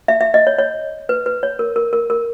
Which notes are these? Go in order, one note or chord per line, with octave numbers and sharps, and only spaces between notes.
E5
E5
D#5
C#5
C#5
B4
B4
C#5
A#4
A#4
A#4
A#4